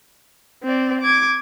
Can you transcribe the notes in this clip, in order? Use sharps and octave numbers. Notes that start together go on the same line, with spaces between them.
C4 D5
D6 G#6